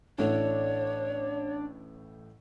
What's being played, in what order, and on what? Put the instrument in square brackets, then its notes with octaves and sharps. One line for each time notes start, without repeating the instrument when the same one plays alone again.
[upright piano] A1 A2 A3 [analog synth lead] D4 [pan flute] C#5